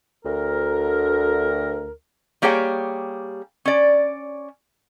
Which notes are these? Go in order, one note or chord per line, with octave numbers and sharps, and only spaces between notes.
D2 A#4
G3 A#3 G4 G#4 C#5 G5
C#4 D5